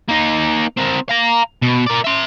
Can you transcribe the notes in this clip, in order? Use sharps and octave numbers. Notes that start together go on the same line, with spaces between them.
A#3 D#4
C4 A#4
F5 A#5
B2
A#4 D5
E5 C6